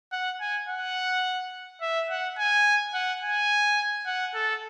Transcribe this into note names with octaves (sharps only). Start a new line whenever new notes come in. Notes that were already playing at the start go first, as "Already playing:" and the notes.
F#5
G#5
F#5
E5
F#5
G#5
F#5
G#5
F#5
A4